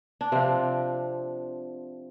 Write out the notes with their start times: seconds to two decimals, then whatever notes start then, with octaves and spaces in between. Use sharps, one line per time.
0.21 D4
0.32 C3 F3 C4